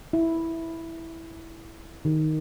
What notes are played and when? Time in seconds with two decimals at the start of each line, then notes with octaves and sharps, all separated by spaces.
0.13 E4
2.05 D#3